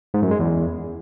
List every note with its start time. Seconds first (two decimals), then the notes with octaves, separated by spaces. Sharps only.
0.14 G#2
0.23 F#2
0.31 G#3
0.40 E2